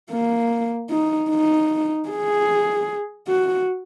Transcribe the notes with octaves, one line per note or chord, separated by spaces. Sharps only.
A#3
D#4
D#4
G#4
F#4